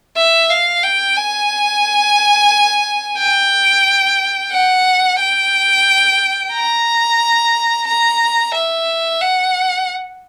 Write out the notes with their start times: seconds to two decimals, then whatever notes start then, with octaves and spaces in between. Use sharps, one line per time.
0.17 E5
0.50 F5
0.84 G5
1.17 G#5
3.18 G5
4.52 F#5
5.19 G5
6.53 A#5
7.87 A#5
8.54 E5
9.21 F#5